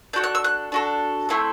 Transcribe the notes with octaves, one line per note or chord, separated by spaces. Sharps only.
D4 F#4 A4 G6
F#6
E6
F#6
D4 F#4 A4
A3 C4 E4 A4